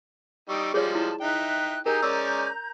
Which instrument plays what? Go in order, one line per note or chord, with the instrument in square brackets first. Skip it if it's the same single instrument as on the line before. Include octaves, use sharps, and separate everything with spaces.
[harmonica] G3 D#4 C#6 [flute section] G5 D#6 E6
[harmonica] F3 G3 G#3 [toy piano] G#4 C#5 [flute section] G6
[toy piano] E4 [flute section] A5
[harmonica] D#4 G5 [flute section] E5 F#6
[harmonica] D#4 G4 G#4 [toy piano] A#4 [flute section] A#5 G6
[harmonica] G#3 C#4 D5 [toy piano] E6